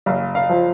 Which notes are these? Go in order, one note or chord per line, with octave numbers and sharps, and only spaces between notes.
F#1 F5
F5
F3